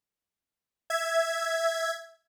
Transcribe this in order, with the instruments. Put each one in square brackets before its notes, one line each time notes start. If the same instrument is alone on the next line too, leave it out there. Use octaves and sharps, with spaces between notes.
[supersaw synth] E5 G#6